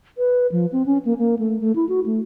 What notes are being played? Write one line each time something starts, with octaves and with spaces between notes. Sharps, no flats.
B4
F3
C4
C#4
A#3
A#3
A3
A3
E4
F#4
A3